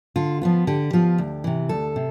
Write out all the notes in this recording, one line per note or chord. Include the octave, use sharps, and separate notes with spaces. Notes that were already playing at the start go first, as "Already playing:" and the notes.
D3 F4
F3 B3 F4
D3 G4
F3 B3 F4
D2
C3 E3
D2 A4
C3